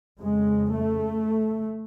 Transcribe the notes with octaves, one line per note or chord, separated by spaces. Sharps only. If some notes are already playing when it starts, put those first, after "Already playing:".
F2 C#3 G#3
A3